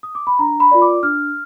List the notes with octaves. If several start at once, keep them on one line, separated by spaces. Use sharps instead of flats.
D#6
D6
B5
D4 A#5
B5
F4 A#4 D5
D6
D4 F6